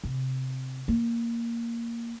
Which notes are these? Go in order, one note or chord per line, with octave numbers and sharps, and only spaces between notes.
C3
A#3